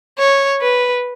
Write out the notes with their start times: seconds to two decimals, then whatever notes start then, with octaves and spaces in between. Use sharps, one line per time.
0.19 C#5
0.62 B4